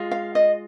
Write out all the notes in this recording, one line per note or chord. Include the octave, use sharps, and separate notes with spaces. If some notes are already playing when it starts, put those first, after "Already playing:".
Already playing: G#3 F4
F5
D#5